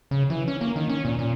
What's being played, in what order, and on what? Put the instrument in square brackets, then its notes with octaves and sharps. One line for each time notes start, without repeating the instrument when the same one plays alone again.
[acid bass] C#3
E3
C#4
A#3
D#3
C#4
A#2
A#2